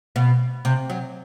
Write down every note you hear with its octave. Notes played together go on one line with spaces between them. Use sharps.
B2
C3
F#3